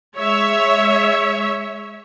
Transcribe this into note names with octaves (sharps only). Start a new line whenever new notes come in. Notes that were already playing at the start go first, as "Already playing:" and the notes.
G#3 C#5 E5